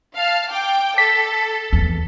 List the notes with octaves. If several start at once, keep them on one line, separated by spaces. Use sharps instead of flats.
F5 A5
G5 D6
A4 B6
E2